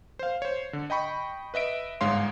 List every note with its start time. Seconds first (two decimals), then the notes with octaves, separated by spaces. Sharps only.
0.19 C5 F5
0.42 C5 C#5
0.73 D3
0.90 D#5 G5 B5 C#6
1.54 B4 D#5 E5 D7
2.01 G1 G#2 G#3 C#5 F5 C6